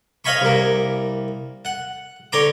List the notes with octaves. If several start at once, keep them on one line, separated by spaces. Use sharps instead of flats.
C#5 D#5 F5 G#5 B5 C#6
C2 A#3
F#5
D3 C#5 A#5 C6 D6